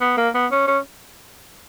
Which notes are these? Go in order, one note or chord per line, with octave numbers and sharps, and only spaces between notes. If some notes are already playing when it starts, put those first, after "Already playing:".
B3
A#3
B3
C#4
C#4